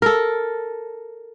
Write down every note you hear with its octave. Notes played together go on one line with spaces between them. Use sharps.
A4 A#4